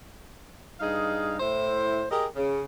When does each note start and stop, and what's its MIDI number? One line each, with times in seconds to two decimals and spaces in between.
0.80 1.36 43
0.80 1.36 63
0.80 1.36 68
0.80 1.36 77
1.40 2.05 45
1.40 2.05 64
1.40 2.05 72
2.11 2.26 67
2.11 2.26 68
2.11 2.26 70
2.11 2.26 75
2.36 2.63 49